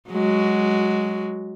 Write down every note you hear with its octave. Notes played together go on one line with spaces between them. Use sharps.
F#3 G#3 F#4